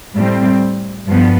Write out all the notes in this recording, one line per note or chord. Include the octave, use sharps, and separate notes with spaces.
A2 G3 C4
G2 F3 B3